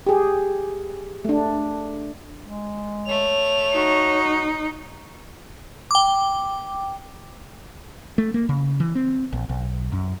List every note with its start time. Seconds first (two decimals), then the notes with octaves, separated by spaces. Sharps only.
0.07 G4 G#4
1.25 A3 D4
2.43 G#3
3.07 A3 C#5 F7
3.75 D#4 F#4
5.91 G5 D6
8.18 A3
8.34 A#3
8.49 C#3
8.80 E3
8.95 C4
9.33 A#1
9.49 B1
9.92 F#2